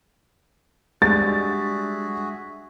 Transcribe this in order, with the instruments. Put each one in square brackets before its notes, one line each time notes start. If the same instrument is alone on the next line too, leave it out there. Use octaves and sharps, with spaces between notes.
[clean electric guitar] G3 [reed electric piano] G#3 D4 [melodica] F#4 G#4 E5 [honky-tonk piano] A6